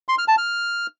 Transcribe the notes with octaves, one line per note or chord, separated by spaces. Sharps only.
C6
F6
A5
F6